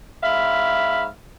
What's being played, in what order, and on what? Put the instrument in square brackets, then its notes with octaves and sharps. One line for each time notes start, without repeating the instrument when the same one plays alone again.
[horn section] G#2 E5 F5 B5